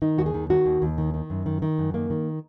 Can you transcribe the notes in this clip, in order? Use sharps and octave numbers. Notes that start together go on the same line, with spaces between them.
D#3 D#4
D#2 F#4
G#4
D#3
D#3 F#4
D#2
D#2
D#3
D#3
F#2
D#3
D#3
F#2
D#3 A#3
D#3